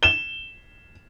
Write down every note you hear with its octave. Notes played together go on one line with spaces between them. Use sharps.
E7 G7